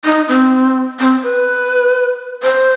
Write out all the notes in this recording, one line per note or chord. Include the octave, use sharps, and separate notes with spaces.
D#4
C4
C4
B4
C5